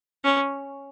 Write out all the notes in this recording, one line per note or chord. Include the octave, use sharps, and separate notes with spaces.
C#4